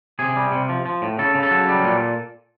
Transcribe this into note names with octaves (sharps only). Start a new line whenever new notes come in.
C3 G#4
G3
C3
F3
F3
A2
C#3 A4
C#3
A4
F#3
G3
A#2